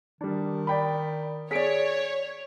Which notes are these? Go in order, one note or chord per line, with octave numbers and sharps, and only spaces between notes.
D#3 G3 D4
D5 G5 B5
G#4 C#5 D5 B6 D7